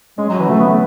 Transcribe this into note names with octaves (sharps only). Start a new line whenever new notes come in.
G#3 C#4
F#3
F#4
E3
F#3 A3
B3
A3